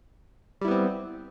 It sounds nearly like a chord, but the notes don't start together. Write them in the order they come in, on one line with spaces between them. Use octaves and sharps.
G3 E4 B3 C4